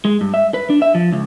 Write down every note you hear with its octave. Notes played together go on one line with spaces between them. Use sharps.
G#3
G2
E5
B4
D4
E5
F3
C#2